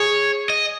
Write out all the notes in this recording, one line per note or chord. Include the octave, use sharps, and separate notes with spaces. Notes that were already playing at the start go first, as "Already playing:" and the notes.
Already playing: G#4 C#5
D#5